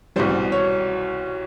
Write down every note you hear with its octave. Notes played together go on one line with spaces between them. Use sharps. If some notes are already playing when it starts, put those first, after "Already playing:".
C2 B2 G3 C5
C#5